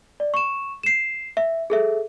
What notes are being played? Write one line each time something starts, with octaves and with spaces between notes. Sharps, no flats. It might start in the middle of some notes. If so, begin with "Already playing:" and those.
D5
C#6 E7
C7 E7
E5
G#4 A4 E5